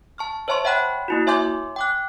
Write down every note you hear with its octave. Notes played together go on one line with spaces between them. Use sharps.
A5 C#6 F6
C5 C#5 E5 A5 C6 C#6
C#5 E5 F#5 G5 B5 F#6
A#3 E4 F#4
C#5 E5 G#5 C6 D6 G6
G5 D6 F#6